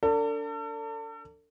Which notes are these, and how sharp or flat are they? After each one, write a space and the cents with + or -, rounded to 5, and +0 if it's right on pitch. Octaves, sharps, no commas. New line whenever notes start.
D4 -25 A4 +40 D5 -25